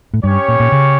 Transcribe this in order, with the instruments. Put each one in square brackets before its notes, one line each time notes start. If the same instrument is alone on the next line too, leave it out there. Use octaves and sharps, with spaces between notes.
[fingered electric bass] A2
[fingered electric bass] G2 [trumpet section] C#4 G4 C#5
[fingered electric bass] A#2
A#2
C#3